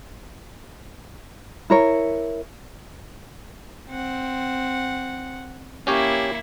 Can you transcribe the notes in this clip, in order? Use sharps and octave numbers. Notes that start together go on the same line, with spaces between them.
E4 A#4 C#5
C4 F#5
A#3 C#4 E4 G4 C#5